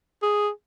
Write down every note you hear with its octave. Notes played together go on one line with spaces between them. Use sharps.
G#4